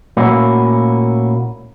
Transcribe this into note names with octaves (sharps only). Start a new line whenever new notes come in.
A#2 A3 A#3 C#4 E4 F#4